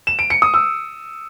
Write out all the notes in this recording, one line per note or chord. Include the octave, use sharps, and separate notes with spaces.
E7
D7
C#7
D#6
E6